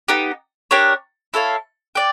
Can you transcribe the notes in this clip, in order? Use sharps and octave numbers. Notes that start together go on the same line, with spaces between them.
B3 D#4 G4
D4 G4 A#4 C#5
E4 A4 C#5 F5
D5 G5